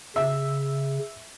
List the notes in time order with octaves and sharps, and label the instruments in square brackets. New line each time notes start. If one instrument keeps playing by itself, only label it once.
[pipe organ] C#3 [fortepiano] E5